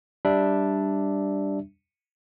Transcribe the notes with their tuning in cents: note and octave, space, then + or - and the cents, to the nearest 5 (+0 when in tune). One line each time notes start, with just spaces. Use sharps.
G3 +0 D4 +0 E5 -5